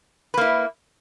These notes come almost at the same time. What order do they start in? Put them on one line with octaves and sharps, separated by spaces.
B4 A#3 E4